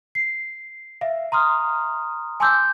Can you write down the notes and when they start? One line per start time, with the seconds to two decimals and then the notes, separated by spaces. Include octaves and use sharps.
0.15 C7
1.01 E5 F5
1.32 A#5 C6 D#6 F6
2.40 G#5 A5 C6 D6 E6 G6